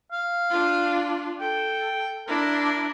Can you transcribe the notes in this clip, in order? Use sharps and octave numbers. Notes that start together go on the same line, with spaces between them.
F5
D4 F4
A4 G5
D4 E4 A#4